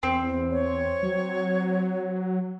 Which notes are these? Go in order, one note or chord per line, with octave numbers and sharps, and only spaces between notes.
E2 C4
C#5
F#3